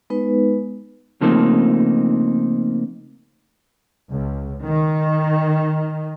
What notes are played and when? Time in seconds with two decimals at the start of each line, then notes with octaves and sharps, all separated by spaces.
0.10 G#3 B3 D#4 B4
1.21 C#3 F3 A3 A#3 C4 D#4
4.10 C#2
4.63 D#3